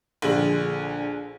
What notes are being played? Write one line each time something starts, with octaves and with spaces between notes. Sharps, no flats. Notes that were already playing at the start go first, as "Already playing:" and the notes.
A#1 D3 G#4 F#7